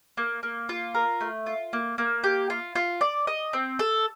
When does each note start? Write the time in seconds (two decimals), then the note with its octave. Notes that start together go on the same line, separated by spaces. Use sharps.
0.17 A#3
0.43 A#3
0.69 F4
0.95 A#4
1.21 A3
1.46 F4
1.73 A#3
1.98 A#3
2.24 G4
2.50 F4
2.75 F4
3.01 D5
3.27 D#5
3.53 C4
3.79 A4